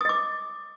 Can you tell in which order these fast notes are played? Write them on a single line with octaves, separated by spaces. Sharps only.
D#6 D#5 D6